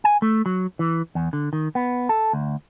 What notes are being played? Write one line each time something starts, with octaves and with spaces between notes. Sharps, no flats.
G#5
A3
F#3
E3
E2
D3
D#3
B3
A4
D2